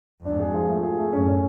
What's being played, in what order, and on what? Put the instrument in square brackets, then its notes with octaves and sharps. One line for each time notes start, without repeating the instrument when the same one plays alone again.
[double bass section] F2 G#2 [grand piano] D4
[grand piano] G#4
F3
A3
G#4
A3
[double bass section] F#2 A2 [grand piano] C#4
[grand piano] C#4